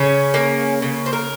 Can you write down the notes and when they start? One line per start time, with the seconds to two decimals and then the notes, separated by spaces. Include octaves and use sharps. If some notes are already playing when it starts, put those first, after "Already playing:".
Already playing: C#3 C#4
0.34 A#3
0.82 C#3
1.06 C5
1.13 A#4